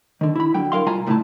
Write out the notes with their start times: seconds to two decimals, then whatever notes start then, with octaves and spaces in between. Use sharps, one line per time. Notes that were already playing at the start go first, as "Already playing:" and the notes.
0.21 D3 D#3
0.36 E4 B5
0.54 D3 F#3 G5
0.72 E4 A#4 F5 C6
0.86 B2 G3 F4 G#5 A#5
1.07 C2 A2 C#3 A#3 E4 A5